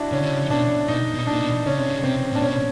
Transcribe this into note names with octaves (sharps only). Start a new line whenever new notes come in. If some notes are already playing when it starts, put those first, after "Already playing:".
Already playing: D4 E4 F#4
C#3 C#4
D3
C#3
B2 D4
B2 D#4
B2
D#4
A#2 D4
B2
C#3 C#4
C3
C#3
C3 C4
A#2 D4
B2 C#4